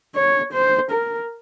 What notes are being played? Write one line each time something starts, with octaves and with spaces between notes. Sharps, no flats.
C#5
C5
A#4